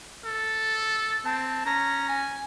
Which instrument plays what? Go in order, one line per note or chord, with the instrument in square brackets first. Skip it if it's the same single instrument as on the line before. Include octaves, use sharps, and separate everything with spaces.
[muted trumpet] A4
[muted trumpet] C4 [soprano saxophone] A5
[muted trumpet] C#4 [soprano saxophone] A#5
[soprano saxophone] G#5